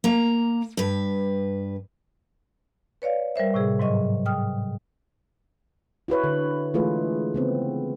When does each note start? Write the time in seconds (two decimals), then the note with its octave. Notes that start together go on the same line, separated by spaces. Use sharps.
0.04 A#3 A#5
0.77 G2 B4
3.02 B4 C#5 D5 F5
3.36 G3 A#4 C5 E5
3.54 A2 C3 G#4
3.79 G#2 F#3 D#5 C#6
4.26 G5 D#6 F6
6.08 E4 F#4 B4 C#5
6.24 D3
6.74 E3 G#3 A3 F4 G#4 B4
7.34 C#3 B3 C4